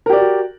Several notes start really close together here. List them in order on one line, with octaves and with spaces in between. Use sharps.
A#4 G4 D5 F#4